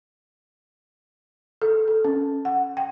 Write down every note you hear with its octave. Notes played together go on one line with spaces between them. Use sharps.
A4
A4
C#4
F#5
G5